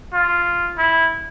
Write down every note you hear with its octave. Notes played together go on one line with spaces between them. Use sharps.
F4
E4